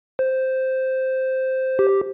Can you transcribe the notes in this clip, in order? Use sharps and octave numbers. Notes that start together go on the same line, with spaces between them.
C5
G4